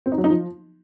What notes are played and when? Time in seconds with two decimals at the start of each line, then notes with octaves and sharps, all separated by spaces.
0.06 C4
0.12 D#4
0.18 F#3
0.24 D#4
0.30 F3